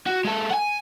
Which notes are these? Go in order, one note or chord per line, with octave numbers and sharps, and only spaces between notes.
F#4
G#3 A4
F#5 G#5